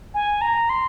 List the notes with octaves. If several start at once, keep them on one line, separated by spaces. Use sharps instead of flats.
G#5
A#5
C6